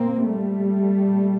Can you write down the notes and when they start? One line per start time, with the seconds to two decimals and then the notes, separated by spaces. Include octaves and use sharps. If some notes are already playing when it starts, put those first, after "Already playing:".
Already playing: A#2 A#3 C4
0.25 G3 A3
1.03 A#2